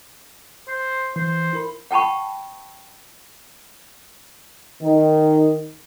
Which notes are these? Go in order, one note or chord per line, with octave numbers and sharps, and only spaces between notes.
C5
E3 C5
E4 A#4 B5
F#5 G5 A5 B5 C#6
D#3